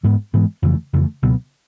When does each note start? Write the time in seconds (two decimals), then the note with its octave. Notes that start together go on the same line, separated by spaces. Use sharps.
0.03 G#2 E3 G#3 B3
0.33 G#2 E3 G#3 B3
0.62 F2 C#3 E3 A3
0.93 F2 C#3 E3 A3
1.22 C#2 B2 F#3 B3